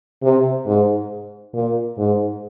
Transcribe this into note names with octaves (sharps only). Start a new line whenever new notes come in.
C3
G#2
A#2
G#2